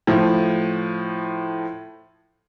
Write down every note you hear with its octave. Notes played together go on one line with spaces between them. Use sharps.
A2 F3